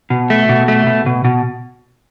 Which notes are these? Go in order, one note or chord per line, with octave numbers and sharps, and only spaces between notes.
B2
A3
B2
A3
B2
B2
B2